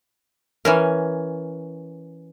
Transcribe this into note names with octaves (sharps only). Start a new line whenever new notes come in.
E3 C#4 A#4